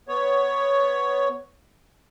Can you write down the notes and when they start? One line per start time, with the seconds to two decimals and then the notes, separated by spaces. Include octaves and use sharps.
0.08 B3 C#5